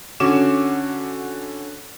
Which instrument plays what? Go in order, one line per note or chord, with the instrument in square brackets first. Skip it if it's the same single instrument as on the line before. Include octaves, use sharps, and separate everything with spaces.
[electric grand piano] D3 C#4 F#4 D6 E7